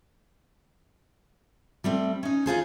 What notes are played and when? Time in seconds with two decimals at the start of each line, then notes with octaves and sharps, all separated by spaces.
1.84 G3 A3 C4
2.23 C#4 D#4
2.46 D#4 F4 G#4 C5